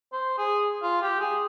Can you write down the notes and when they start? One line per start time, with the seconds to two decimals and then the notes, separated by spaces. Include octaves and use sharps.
0.12 C5
0.38 G#4
0.82 F4
1.02 G4
1.20 G#4